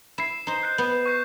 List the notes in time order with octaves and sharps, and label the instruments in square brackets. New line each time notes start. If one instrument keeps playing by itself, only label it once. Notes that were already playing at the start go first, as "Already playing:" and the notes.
[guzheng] E4 [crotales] C7 E7
[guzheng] D#4 C5
[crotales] F#6 G6 C7
[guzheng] B3
[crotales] C#6 G6 C7